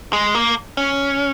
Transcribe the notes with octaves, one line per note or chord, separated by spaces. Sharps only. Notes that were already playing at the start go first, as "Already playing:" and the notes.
G#3
A#3
C#4